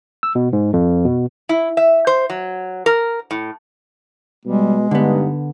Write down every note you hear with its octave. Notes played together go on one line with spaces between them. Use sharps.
E6
B2
G#2
F2
B2
E4
E5
C5
F#3
A#4
A2
B2 G3 G#3
G2 D3 B3 D#4